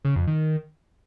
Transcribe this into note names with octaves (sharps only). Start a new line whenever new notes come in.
C#3
F2
D#3